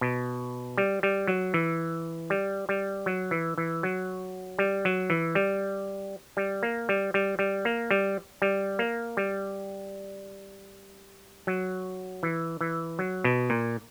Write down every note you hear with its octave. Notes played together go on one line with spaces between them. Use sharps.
B2
G3
G3
F#3
E3
G3
G3
F#3
E3
E3
F#3
G3
F#3
E3
G3
G3
A#3
G3
G3
G3
A#3
G3
G3
A#3
G3
F#3
E3
E3
F#3
B2
A#2